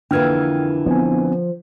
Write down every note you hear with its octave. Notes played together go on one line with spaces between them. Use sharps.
F2 D3 E3 A#3 B4 G5 F6 G#6
F3 B3 C4 G#5